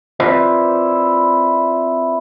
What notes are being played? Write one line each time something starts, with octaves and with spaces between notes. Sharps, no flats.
C4 E4 F4 B4 C5 D5